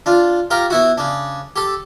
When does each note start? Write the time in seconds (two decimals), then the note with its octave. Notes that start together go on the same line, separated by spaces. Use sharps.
0.06 D4 F4
0.51 F4 G4 A#4
0.70 B3 E4 F#4
0.98 C#3 D4
1.56 G4 A4